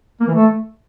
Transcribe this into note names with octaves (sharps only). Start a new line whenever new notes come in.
A#3
E3
A3